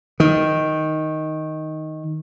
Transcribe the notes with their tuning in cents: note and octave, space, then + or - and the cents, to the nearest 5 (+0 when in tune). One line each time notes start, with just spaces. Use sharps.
D#3 +5